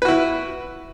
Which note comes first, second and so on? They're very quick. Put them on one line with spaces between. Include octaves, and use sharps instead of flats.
B4 F#4 E4